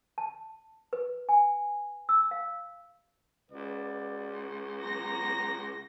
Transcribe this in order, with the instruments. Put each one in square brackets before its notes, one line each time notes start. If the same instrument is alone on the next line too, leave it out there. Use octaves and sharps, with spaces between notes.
[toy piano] A5
B4
G#5
E6
F5
[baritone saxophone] C#2 [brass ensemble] F#4 B4 D5
[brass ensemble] F#3 B3 A#5 [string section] A#6